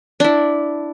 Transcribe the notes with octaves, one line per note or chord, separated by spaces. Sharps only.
D4 E4